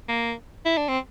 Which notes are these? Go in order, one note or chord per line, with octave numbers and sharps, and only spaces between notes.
A#3
E4
D4
C4